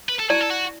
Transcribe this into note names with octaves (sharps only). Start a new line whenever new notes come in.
B4
A4
E4 F#4 D5 A5
A4
F#4